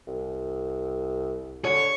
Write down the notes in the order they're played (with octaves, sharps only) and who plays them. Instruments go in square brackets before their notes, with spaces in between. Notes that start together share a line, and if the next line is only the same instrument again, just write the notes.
[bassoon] C2
[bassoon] D3 [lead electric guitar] C#5